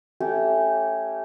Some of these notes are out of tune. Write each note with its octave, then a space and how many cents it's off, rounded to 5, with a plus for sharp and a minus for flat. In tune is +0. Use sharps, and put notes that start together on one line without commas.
A3 +0 C#4 -10 G4 -20